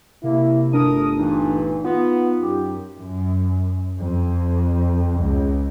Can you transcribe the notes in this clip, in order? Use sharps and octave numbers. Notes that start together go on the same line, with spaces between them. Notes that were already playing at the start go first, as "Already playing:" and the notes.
C3 A#3 E4
G1 A3 D4 A#4 D#6
G2 A#2 E3 D#4
B3 F4
F#2 G4
F#2
F2
C#2